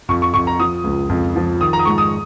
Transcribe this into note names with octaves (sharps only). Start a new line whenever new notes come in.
F2 C#6
C#6
F2 C#6
A#5
F3 D#6
C#2
F2
F3
D#3 D#6
A#5
D#6
G#2 C#6
D#6